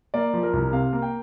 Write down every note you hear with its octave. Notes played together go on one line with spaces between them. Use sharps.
A#3 D5
F3
A#4
C2
C3 F5
A#3
G5